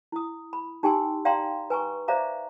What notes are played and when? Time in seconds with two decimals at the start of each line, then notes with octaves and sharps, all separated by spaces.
0.12 E4 D#6
0.53 B5
0.83 D#4 G4 G5 G#5 C6 E6
1.25 D5 F5 G5 A#5 C6
1.70 B4 G#5 A#5 C#6
2.08 C5 D5 E5 F5 A#5 D6